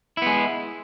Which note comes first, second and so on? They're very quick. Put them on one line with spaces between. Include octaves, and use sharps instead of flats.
E4 B3 G#3